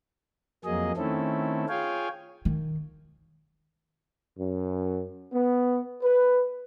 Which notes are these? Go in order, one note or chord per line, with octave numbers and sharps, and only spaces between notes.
F2 F#3 A#3 G#4 D#5
D#3 A3 C4 C#4 E4 A4
F4 G#4 C#5 F5 G5 G#5
D#3
F#2
B3
B4